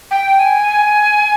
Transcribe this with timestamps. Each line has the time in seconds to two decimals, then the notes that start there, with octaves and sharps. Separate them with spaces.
0.11 G5
0.39 G#5
0.68 G#5